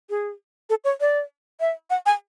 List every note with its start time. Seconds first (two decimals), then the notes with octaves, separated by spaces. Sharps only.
0.10 G#4
0.70 A4
0.84 C#5
1.01 D5
1.60 E5
1.90 F#5
2.06 G#5